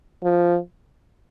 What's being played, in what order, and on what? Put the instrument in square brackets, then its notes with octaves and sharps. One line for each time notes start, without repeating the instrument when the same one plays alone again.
[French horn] F3